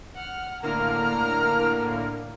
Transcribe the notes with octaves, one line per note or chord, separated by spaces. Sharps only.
F#5 F6
A2 D3 A#3 A#4 A#5 F6